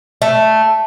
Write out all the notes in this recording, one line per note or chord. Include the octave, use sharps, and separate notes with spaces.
A3